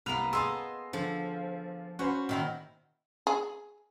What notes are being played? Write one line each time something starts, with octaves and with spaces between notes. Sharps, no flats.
C2 A#3 B3 B4 F7
G#4 D#5 A5 C6 E6
D3 F3
C#4 F#4 C5 B5
A#2 D#3 E4
G#4